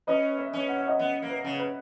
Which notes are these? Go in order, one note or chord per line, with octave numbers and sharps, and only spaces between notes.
C#4 B4 D#5
C#5 E5
C#4
F#5
E5
D#5 F#5
B3
A#3
B4
C#3
B4